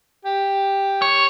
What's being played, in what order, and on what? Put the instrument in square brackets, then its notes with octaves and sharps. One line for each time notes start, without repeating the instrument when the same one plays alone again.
[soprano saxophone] G4
[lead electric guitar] C#5